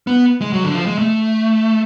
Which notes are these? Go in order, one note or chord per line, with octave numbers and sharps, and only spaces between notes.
B3
G#3
F#3
D3
F3
G#3
A3